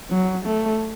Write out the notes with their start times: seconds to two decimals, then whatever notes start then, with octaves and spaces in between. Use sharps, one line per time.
0.10 F#3
0.45 A3